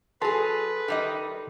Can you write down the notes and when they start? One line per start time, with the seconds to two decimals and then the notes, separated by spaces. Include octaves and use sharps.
0.22 F#3 G#4 A4 B4 A5 C6
0.88 D#3 G3 D#5